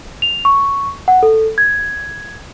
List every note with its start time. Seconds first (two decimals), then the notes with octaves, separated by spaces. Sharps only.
0.22 F7
0.45 C#6
1.08 F#5
1.23 A4
1.58 G#6